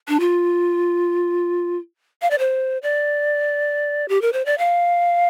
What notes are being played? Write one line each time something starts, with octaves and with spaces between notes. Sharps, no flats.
D4
F4
F5
D5
C5
D5
G4
A#4
C5
D5
F5